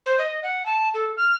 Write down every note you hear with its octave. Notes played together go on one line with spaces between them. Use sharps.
C5
D#5
F#5
A5
A4
F6